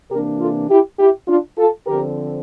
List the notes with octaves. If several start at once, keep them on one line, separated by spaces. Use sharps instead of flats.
C3 E3 A#3 D4 G4 A#4
F4 A4
E4 G4
E4 G4
D4 F4
F4 A4
D3 F3 C4 G4 A#4